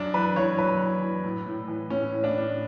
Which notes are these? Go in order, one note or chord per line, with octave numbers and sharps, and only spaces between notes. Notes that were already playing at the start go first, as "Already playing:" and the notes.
Already playing: F#2 D4
E3 B4
E3 C#5
F#2 B4
E3
E3
A2
A2
E3
A2 C#4
A2
D4
A2